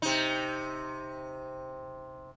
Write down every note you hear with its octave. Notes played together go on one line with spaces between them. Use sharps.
C3 D#4